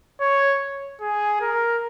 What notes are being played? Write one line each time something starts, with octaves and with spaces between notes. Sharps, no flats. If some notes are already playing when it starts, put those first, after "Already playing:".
C#5
G#4
A#4